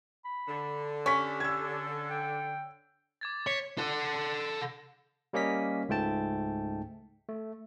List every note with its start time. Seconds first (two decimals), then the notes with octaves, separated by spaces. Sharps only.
0.25 B5
0.48 D3
1.06 C#4 G4 C#6 B6
1.40 E6 G#6
2.10 G5
3.21 D6 G#6 A6
3.47 C#5 B6
3.78 A4 F#5
5.33 G3 A#3 C#4 D#5 B6
5.89 C#2 G#2 A3 G5 A5
7.29 A3